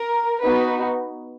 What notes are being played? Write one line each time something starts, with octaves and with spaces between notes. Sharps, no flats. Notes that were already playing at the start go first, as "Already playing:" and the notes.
Already playing: A#4
B3 D#4 F#4 B4